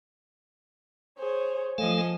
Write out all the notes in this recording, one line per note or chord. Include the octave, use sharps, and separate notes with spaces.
G#4 C5 C#5
F3 A3 A4 D#5 F5 G#5